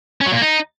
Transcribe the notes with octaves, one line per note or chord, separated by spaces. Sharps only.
C#4
F#3
A#2
A#3
D#4